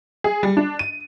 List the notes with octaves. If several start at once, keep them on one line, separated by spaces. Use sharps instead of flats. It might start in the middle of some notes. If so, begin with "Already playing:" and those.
G#4
G3
D4
D#7